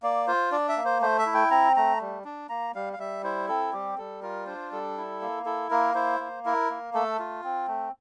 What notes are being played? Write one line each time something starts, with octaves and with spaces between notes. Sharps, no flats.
A#3 D5
F4 C5
D4 D5
E5
A#3
C5
A3 C5
E5
E4
G5
C4 A#5
A3 A#5
G3
D4
A#3 A#5
G3 F5
F5
G3 E5
E4 C5
C4 A4
G3 G4
G3 A4
F4 A#4
D4 C5
G3 A4
E4
A#3
E4 A4
A#3 A#4
E4 C5
A#3
E4 A#4
A#3
A3 A4
F4
C4
A3